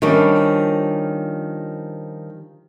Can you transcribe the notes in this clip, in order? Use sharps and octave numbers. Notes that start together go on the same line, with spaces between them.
D#3 F3 G3 C#4 D4